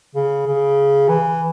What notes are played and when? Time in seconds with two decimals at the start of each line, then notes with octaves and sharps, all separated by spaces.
0.15 C#3
0.47 C#3
1.09 E3